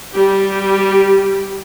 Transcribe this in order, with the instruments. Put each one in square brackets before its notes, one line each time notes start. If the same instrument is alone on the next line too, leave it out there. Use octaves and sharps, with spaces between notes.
[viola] G3 G4